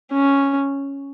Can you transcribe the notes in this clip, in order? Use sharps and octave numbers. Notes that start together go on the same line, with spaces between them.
C#4